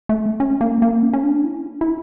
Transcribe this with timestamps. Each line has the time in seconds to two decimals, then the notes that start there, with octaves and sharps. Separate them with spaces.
0.09 A3
0.40 C#4
0.61 A#3
0.82 A#3
1.03 C#4
1.13 C#4
1.23 D4
1.45 E4
1.81 E4